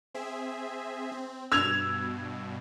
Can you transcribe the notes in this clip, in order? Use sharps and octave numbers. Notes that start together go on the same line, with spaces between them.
C4 G#4 E5
C4
G2 B2 E6 G#6 F7